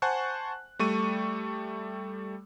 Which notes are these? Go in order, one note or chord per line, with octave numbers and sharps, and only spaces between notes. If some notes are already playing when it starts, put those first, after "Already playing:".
C5 F#5 G#5 A5 C#6 F#6
G3 A3 C#6 D#7